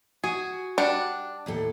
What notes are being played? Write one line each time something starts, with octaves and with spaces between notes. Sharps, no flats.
F#4 G#4
G3 D4 F#5
D#2 A2 A4